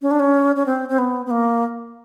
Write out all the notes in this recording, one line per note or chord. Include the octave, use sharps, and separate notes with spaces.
C#4
D4
C#4
C#4
C4
C4
B3
B3
A#3